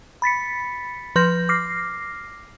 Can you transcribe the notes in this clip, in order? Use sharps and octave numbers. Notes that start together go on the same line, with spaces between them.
B5 A6 B6 C#7
F3 B4 C6 G6 A#6
D6 F6 A#6 C7